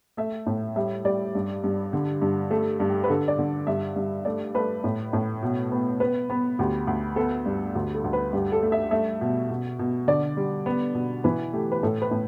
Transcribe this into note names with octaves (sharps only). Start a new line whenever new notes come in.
A3 E5
A2
G3 E5
G3 D5
G2
G2
D3
G2
A3 A4
G2
G4
B4
D3 A4
D5
D3
G2 E5
G2
A3 D5
A3 B4
A2
A2
B2
B3
B3 B4
B3
D2 G4
D2
B3 A4
G2
D2
A4
D2
B4
G2 G4
A4
A3
E5
A3 E5
B2
B2
B2
D3 D5
G3
B3
B2
E3 B4
A3 G4
B4
A2 A4
B4
A2